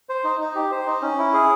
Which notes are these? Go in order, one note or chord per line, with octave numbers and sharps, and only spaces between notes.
C5
D#4
D#4
G4
C5
D#4
C#4
E4
G#4